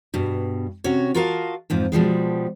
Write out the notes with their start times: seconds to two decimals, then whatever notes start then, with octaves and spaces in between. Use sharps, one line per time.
0.14 G2 B2
0.84 C3 C#4 F#4 C#5
1.14 F4 F#4 A#4 D#5 F5 A5
1.70 F2 G#2 F3
1.92 B2 F3 G3 G#3